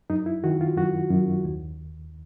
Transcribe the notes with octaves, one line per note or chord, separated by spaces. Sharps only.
F#2 D#4
E4
D#3 F#4
F4
F#2 F#4
F#2
D#2